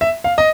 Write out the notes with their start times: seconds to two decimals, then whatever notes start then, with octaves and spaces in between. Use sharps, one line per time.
0.01 E5
0.24 F5
0.38 D#5